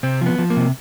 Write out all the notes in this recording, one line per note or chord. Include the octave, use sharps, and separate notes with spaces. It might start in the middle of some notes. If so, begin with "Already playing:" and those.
C3 C4
F3 B3
F3
A#3
C3